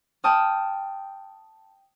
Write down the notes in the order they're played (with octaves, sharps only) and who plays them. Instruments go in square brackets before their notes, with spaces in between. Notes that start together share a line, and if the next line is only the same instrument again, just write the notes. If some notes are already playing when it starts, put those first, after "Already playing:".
[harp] G5 A5 D#6 F6